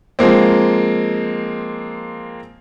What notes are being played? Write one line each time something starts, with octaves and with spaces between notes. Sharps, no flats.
F3 G#3 A#3 C4